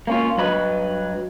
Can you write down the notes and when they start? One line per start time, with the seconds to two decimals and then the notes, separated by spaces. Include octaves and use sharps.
0.07 A#3 C#4 F4
0.37 G2 F#3 B4 D#5